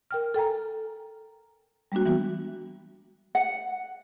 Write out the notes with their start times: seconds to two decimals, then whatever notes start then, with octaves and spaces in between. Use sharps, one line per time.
0.11 A#4 G5 F6
0.34 A4 G5 G#5 A#5
1.92 G3 G#3 A#3 D4 F#4
2.06 E3 G3 B3 F#4
3.35 F#5